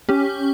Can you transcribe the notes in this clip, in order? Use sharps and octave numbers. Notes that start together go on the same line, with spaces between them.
C#4 G4